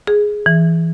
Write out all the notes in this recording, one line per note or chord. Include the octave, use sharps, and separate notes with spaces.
G#4
E3